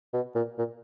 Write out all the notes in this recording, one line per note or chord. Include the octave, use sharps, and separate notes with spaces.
B2
A#2
A#2